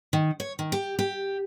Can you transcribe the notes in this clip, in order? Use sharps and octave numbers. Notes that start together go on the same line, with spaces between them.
D#3
C#5
D#3
G4
G4